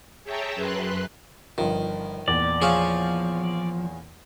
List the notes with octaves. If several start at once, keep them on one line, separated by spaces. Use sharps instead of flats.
G#4 C#5 E5 G5 A5 A#5
F#2 B4 C6 F#6
G1 D#3 F3
E2 A#2 D5
F3 G#4 C#5 F5